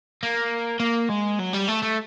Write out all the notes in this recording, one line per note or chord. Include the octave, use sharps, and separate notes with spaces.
A#3
A#3
G#3
F#3
G3
A3
A3